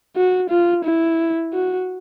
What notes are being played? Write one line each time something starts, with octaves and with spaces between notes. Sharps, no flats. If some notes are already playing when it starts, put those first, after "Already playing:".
F#4
F4
E4
F#4